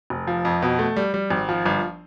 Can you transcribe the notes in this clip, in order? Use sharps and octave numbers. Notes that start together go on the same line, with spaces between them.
F1
F3
F2
B2
A3
G3
G3
G#1
F3
G1